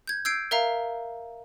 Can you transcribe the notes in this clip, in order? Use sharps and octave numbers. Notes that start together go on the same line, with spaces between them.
G6 G#6
E6 G6 G#6 C7 D7
A#4 E5 F5 A#5